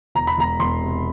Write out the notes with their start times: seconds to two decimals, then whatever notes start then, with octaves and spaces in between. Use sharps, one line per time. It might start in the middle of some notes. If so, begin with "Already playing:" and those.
0.15 E1 A#5
0.27 B5
0.37 E1 A#5
0.59 E1 C6
0.81 C3